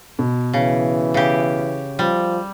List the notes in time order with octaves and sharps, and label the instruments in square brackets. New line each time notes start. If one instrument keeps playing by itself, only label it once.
[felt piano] B2
[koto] C#3 [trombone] E3
[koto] C#3 G4
[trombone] F3 [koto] G3